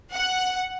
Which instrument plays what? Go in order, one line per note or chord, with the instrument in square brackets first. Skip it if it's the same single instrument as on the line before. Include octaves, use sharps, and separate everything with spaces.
[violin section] F#5